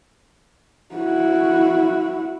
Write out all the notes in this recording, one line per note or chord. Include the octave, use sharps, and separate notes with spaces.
E4 F#4